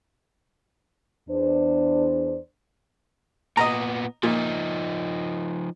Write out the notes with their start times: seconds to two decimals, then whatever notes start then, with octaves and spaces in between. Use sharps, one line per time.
1.28 E2 D4 C5
3.57 A#2 B3 D#5 A#5
4.23 A#2 F3 D#4